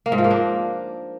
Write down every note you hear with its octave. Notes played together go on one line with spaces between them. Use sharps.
A#3
G#2
F3
A#3
D4